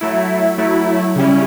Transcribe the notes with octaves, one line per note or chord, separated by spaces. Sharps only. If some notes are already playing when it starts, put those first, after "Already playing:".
F#3 A3 E4
F#3 A3 E4
C#3 G3 C#4 E4